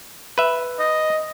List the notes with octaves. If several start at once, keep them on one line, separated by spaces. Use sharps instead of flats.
B4 E5
D#5